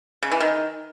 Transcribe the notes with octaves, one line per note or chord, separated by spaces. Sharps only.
C#3
E3
D#3